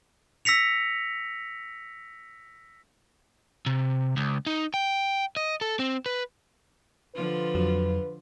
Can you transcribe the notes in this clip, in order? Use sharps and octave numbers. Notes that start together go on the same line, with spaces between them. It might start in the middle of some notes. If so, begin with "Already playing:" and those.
E6 A#6 B6 C#7 F7
C3
C#2
D#4
G5
D#5
A4
C4
B4
D3 F3 F4 B4
F2 F#3